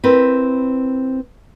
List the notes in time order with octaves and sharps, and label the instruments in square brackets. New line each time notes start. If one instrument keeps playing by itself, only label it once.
[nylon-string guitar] C4 E4 A#4 B4